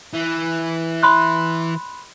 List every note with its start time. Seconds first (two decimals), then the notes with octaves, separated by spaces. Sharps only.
0.14 E3
1.03 B5 C6 F#6